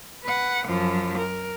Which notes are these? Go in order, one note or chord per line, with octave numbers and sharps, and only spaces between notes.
B4 F#5
F#2 F3
A#4